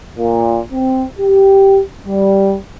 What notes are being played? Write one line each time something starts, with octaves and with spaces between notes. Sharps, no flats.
A#2
C4
G4
G3